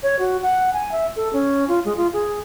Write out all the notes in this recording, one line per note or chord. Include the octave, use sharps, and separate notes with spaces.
C#5
F#4
F#5
G#5
E5
A4
C#4
F4
G#3
F4
G#4